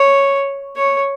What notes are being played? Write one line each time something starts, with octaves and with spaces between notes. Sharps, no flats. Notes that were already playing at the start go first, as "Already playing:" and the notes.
Already playing: C#5
C#5